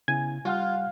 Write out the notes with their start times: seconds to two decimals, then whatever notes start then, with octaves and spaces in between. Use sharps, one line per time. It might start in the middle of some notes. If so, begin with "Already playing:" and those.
0.08 C#3 B3 E4 G#5
0.45 G3 F4 F#5 F6